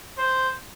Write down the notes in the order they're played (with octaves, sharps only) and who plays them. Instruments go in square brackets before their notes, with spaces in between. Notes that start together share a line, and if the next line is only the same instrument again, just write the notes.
[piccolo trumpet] C5